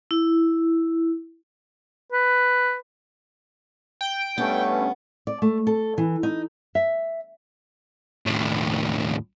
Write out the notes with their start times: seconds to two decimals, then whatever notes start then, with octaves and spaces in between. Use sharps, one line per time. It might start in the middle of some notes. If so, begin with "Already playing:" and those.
0.11 E4
2.13 B4
4.01 G5
4.38 G2 A3 B3 C#4
5.27 D5
5.42 A3
5.67 A4
5.98 E3
6.23 D#4
6.75 E5
8.26 D#2 A2